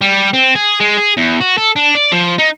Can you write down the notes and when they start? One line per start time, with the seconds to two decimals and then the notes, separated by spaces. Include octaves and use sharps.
0.01 G3
0.33 C4
0.55 G#4
0.80 G#3
0.98 G#4
1.17 E2
1.41 F#4
1.58 A4
1.76 D4
1.95 D5
2.12 F3
2.39 D#4